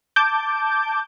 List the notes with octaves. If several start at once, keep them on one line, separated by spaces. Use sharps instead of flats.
A5 D6 G6